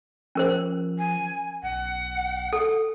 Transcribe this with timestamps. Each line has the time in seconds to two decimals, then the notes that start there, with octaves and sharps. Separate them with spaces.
0.35 F3 C#4 A#4 C5
0.99 G#5
1.63 B1 F#5
2.53 A4